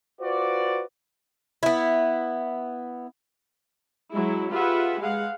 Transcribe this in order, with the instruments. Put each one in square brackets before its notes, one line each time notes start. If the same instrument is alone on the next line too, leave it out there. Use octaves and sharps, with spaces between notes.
[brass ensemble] F4 F#4 B4 C5 D5
[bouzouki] B3 E4
[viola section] F#3 G#3 E4
F4 G4 G#4 B4 E5 F#5
G#3 F5 F#5